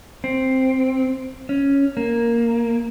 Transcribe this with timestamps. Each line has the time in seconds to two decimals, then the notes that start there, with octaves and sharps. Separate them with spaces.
0.24 C4
1.49 C#4
1.97 A#3